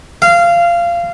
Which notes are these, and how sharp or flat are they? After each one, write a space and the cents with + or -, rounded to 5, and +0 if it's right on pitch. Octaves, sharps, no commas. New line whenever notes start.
F5 -20